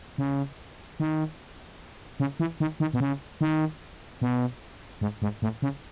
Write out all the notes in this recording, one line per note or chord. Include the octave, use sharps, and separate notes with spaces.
C#3
D#3
C#3
E3
D#3
D#3
B2
C#3
D#3
B2
G#2
G#2
A2
C#3